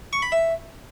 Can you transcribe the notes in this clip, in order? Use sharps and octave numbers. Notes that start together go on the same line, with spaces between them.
C#6
B5
E5